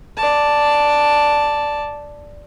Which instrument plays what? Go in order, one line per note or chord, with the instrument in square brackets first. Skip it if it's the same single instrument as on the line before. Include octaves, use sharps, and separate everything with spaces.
[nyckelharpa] D5 A5